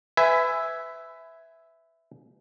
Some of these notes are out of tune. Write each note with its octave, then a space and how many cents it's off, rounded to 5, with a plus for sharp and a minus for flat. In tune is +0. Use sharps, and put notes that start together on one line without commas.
B4 +25 E5 +0 G#5 +0